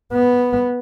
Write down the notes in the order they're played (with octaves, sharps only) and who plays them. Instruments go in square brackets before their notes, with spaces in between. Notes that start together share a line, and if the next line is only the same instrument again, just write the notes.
[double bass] B3